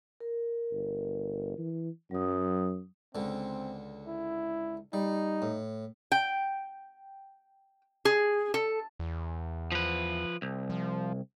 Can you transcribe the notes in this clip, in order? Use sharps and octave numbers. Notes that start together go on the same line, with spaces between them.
A#4
G1
E3
F#2 F#3 D#6
C#2 D3 C4
E4
G3 D#4
A2
G5
G#4
A4
E2
F3 B4
C2
F3